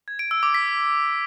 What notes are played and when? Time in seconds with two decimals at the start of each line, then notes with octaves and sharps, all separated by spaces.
0.08 G#6
0.19 D7
0.31 E6
0.43 D6
0.54 B6